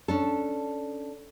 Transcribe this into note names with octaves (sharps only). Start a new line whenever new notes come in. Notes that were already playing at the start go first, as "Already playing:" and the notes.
C#4 D4 A4